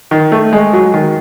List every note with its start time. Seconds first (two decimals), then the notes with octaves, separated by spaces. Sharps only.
0.11 D#3
0.32 A3
0.53 G#3
0.73 F#3
0.94 D#3